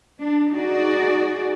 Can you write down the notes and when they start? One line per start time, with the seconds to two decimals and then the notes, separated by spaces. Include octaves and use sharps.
0.19 D4
0.52 D#4 F#4 G#4 D5